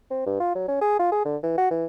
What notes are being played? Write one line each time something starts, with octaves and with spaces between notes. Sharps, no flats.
C4
G2
F4
F#3
C#4
G#4
F4
G#4
D3
E3
F#4
E3